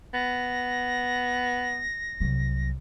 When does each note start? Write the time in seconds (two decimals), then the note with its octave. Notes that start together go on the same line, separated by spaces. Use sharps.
0.14 B3 A#6
2.20 C2 F#3